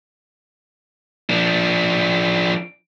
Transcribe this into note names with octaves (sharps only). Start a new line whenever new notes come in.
F3 D4